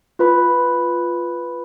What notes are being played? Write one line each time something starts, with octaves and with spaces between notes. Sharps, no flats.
F4 B4 B5